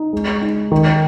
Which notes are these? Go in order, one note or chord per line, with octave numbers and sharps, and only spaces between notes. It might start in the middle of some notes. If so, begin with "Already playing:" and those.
Already playing: D#4
G#3
D#4
D#3